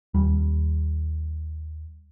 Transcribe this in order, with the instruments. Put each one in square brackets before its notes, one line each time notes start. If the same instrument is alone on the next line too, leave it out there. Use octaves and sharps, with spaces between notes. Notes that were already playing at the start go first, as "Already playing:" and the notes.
[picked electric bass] D#2 G3